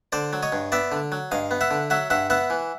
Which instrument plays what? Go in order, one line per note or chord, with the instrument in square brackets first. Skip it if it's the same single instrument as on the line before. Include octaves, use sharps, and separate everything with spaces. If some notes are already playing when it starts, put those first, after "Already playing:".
[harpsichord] D3 C5 D5
F#3
C#5 D#5
G2
B3 D5 E5
D3
F#3
G2 D#5 F5
B3
E5 F#5
D3
F#3 E5 F#5
G2 E5 F#5
B3 E5 F#5
E3